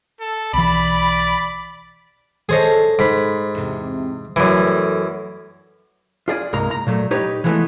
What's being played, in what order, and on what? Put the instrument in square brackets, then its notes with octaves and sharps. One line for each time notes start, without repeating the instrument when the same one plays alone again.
[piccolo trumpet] A4
[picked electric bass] B1 E3 [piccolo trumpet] D5 [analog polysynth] B5
[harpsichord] G#4 C5 D#5 [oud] A4 C#5
[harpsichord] G#2 B5
[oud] E2 C3
[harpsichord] F#2 E3 [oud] G3 A3
[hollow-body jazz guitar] F4 G#4 D5 G#5
C2 G2 G#3 A#3 A#5
A#5
A#2 F#3 A3
D#4 G4 B4 C#5
E3 F3 G#3 A3 B3